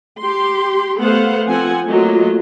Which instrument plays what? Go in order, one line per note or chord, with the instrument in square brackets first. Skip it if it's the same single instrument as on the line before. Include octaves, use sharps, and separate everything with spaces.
[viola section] G4 C6
A3 B3 A4 C5 F5 F#5
F3 C4 A4 F#5 G#5
F#3 A3 A#3 F4 D#5